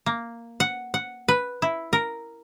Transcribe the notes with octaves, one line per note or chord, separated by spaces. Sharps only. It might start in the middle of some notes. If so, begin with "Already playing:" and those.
A#3
F#5
F#5
B4
E4
A#4